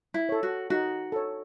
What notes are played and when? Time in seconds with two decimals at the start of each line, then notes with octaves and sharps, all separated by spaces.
0.14 E4
0.29 A4 C#5
0.43 F#4
0.70 D#4 F#4
1.12 A4 C#5